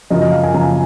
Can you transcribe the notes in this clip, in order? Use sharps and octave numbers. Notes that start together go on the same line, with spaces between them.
F#2 C#3 F3 D#5
D#5
F5
G#5
F#2 C#3 F3 A#5